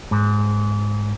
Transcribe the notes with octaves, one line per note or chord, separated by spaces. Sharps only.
G#2